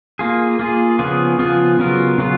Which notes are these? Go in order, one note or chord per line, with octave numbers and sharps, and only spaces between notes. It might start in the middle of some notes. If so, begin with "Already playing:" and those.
A#3 F4 G#4
A#3 F4 G#4
C#3 F3 B3 F4 G#4
C#3 F3 B3 F4 G#4
C#3 F#3 B3 F4 A#4
C#3 F#3 B3 F4